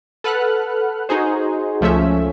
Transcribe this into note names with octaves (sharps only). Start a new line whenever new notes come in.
A4 B4 F#5 F6 F#6
D#4 F#4 G#4 C5
C#2 F3 A3 C#4 E5